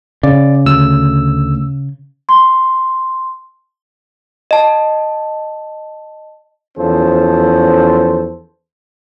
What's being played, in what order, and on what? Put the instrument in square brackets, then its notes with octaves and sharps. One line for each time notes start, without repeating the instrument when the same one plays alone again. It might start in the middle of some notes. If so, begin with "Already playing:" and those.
[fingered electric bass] C#3 [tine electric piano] D5
[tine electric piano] D2 E6
[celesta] C6
[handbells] D#5 A5
[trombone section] E2 F3 C#4 A4 C5